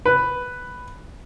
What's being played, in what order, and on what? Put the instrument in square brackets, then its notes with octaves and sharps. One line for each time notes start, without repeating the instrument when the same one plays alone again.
[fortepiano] B4